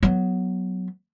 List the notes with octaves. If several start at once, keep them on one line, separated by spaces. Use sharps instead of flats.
F#3 B3